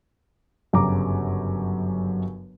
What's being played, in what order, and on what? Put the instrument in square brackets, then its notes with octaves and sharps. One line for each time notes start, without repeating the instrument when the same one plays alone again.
[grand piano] G1 F#2 C#3 A#5 D6